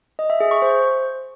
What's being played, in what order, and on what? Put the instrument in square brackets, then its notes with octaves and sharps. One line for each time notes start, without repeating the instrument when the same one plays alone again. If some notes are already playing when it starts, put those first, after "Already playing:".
[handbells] D#5
E5
G#4
C#6
C5